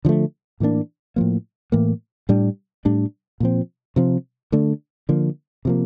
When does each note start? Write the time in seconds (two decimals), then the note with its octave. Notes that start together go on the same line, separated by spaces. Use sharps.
0.05 D3 F3 A3
0.60 A2 E3 A#3 D4
1.16 A2 F3 A#3
1.72 A2 E3 A#3
2.29 A2 G3 D4
2.85 A2 G3 D4
3.40 A#2 F3 C4
3.96 C3 F3 C4
4.52 D3 A3 D4
5.09 D3 F3 A#3
5.65 C3 F3 A#3